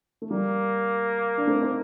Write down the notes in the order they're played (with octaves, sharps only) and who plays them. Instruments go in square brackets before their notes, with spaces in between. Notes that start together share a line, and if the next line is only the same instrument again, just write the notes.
[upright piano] A3
[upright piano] G3 [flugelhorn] A#3
[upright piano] D4
A3 C4
C4 D#4